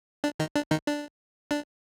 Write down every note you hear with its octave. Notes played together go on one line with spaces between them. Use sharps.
D4
D#3 D#4
D4
D#3 D#4
D4
D4